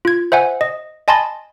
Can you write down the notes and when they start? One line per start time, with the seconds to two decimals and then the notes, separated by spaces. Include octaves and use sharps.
0.05 F4 G#6
0.32 C5 E5 F#5 G#5
0.61 D#5
1.08 D#5 G#5 A5 B5 C6 A6